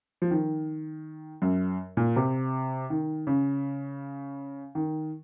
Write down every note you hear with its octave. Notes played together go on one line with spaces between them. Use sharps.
F3
D#3
F#2
A#2
C3
D#3
C#3
D#3